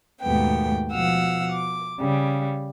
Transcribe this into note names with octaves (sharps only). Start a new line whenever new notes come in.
D#2 G#2 B2 A3 B3 G5
B2 F3 F5 F#5 E6
D6
C#3 G3